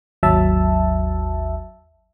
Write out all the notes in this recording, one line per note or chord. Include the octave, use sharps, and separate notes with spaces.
G#1 D#2 F#3 E5 A5